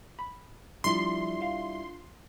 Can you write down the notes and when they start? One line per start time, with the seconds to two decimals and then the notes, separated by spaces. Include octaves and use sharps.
0.19 B5
0.84 F3 G3 D4 E4 F4 C6
1.42 F5